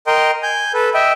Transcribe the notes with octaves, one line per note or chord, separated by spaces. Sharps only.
A#4 D#5 G5 C6
G#5 G6
A4 B4
D#5 E5 G5